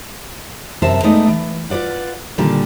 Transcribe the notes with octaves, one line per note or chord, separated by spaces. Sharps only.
F#2 C3 A#4 C5 E5 A5
G#3 A3 B3 D#4 D5 D#5
E3
F4 B4 C5 D5 F#5
A#2 D3 D#3 G3